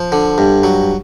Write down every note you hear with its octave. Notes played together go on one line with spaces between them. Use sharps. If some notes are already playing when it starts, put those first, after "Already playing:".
Already playing: F3
D3
G2
F#3